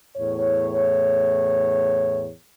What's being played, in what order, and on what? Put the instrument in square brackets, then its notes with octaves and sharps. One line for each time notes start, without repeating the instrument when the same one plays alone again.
[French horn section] E2 A2 C#5